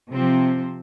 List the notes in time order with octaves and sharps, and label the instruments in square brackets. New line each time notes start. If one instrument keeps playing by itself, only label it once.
[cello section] C3 F3 C4